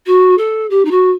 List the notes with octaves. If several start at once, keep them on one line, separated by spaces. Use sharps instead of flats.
F#4
A4
G4
D#4
F#4